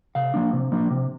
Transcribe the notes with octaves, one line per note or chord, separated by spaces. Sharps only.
C3 F5
F3 A#3 D4
C3
F3 A#3 D4
C3